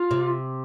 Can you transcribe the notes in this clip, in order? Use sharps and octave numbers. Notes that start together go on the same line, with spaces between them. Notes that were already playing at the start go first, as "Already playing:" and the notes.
Already playing: F4
C3